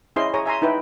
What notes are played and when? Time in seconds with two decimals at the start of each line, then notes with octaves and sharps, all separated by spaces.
0.16 C#4 E4 G#4 C5 D#5 C6
0.34 G#4 C#5 A#5 D#6
0.46 E5 G#5 A#5 C6
0.62 D#4 E4 B4 G5